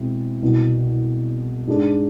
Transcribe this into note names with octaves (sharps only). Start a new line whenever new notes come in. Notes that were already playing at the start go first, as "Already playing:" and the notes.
Already playing: B2 G#3 C4 E4
C2 B2 B3
G#2 G#3 D4